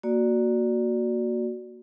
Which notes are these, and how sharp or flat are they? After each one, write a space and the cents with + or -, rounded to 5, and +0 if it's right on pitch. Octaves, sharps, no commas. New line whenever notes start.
A#3 +0 F#4 +0 D5 +0